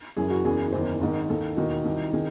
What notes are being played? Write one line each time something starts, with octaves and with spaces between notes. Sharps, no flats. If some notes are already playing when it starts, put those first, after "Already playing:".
F#1 F#2 E3 G#4
F#4
F#1 E2 C#3 E3 G#4
F#1 E2 D#3 C5
G#1 G#2 D#3
D#2 D#3 A4
E1 D#2 D#3 F#4
C2 C3 D#3
C3 D#3 G#4